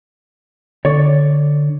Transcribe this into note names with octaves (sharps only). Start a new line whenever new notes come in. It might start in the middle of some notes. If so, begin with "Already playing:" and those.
D3 C#5 D5